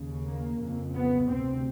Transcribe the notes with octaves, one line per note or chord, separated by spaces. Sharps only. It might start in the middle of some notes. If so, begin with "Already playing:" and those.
Already playing: D#2 C#3
A#3
F2 C#3
B3
D2 C3 C4